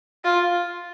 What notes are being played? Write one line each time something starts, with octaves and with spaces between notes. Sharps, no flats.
F4